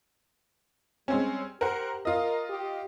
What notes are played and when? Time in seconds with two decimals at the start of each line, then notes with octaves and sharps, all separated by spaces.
1.08 G3 G#3 C4 C#4
1.61 G4 A#4 C5 F#5
2.05 F4 A#4 D#5
2.49 G4